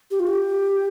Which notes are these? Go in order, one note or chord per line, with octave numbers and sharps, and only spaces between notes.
G4
F4
G4